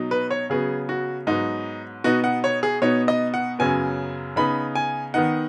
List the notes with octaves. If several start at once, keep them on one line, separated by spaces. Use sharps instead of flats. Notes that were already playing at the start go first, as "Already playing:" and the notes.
Already playing: B2 F#3 D#4
B4
C#5
C#3 F#3 B3 G#4
F#4
G#2 F#3 B3 D#4
B2 B3 D#4 F#4
F#5
C#5
G#4
B2 B3 D#4 C#5
D#5
F#5
F#2 C#3 F#3 B3 G#5
C#3 B3 D#4 B5
G#5
D#3 B3 D#4 F#5